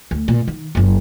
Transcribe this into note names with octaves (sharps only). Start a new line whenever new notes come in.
D2
A#2
D#3
F#1 F#3